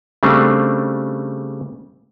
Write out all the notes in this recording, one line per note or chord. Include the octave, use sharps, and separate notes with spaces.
C#3 G3 A3 C4 D4